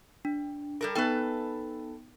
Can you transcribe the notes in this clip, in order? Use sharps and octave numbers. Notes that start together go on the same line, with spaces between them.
D4
G3 A4 A#4
B3 D#4 A4 B4 G5